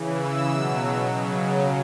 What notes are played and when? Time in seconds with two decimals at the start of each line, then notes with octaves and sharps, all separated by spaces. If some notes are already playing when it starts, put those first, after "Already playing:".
Already playing: C#3 E3
0.18 E6
0.48 B2 F#3
1.10 C#3 F#3